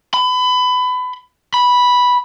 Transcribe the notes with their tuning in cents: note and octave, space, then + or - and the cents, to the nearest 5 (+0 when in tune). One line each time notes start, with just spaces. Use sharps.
B5 +25
B5 -5